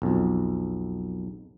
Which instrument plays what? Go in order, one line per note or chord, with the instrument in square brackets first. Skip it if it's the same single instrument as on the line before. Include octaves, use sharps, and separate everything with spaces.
[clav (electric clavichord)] B1 F2